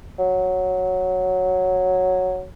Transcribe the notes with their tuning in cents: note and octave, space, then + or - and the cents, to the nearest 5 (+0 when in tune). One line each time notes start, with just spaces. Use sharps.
F#3 -5